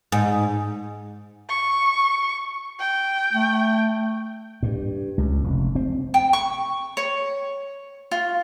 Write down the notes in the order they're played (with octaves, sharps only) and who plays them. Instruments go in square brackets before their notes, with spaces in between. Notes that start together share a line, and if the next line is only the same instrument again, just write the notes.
[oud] G#2
[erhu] C#6
G5
[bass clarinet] A3
[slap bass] G2
C#2
F1
C4
[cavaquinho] G5
C#6
C#5
F4